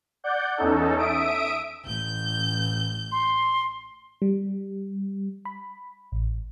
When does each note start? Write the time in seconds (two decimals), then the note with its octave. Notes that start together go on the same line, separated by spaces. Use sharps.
0.24 D5 F#5 G6
0.57 E2 C#4 D#4 A4
0.98 E5 D#6 D7
1.85 A1 G6
3.12 C6
4.22 G3
5.45 B5
6.12 A1